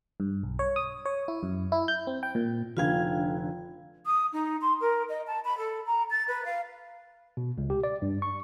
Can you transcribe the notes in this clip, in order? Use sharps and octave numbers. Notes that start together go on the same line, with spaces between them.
G2
B1
C#5
D#6
C#5
E4
F#2
E4
G6
C4
G5
A#2
F1 D3 F4 F5 G5 G#6
D#6
D#4
C6
A#4
D#5
A5
B5
A4
A#5
A6
B4
F5
B2
C#2
G4
D5
G2
C#6